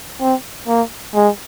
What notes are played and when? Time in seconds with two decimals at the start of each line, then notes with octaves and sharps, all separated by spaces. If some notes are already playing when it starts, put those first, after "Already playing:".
0.21 C4
0.68 A#3
1.15 G#3